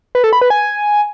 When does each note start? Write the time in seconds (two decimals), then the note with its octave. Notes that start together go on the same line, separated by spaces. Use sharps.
0.15 B4
0.24 A4
0.33 B5
0.41 B4
0.50 G#5